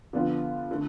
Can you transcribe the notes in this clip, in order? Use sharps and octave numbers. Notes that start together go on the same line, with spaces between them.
D3 F3 B3 D4 F4
D3 A3